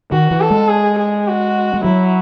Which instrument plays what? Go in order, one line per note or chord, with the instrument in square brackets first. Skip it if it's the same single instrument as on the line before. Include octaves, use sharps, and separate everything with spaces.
[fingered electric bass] D#3 [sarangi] F#4
[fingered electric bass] E3
[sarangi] A4
[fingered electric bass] G#3
[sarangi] G#4
G#4
F#4
[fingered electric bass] G#3
[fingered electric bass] F#3 [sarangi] E4